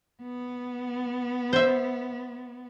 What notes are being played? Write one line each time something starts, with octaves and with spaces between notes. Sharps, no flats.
B3
C5 E5